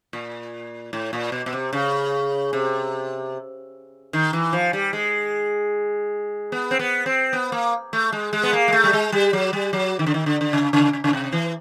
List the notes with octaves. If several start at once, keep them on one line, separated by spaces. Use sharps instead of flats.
A#2
A2
A#2
B2
B2
C3
C#3
C3
D#3
E3
F3
G3
G#3
B3
C4
B3
C4
B3
A#3
A3
G#3
G#3
B3
A#3
G#3
A3
G3
G#3
G3
F#3
G3
F#3
D#3
D3
D#3
D3
D3
C#3
C#3
C#3
C#3
C3
E3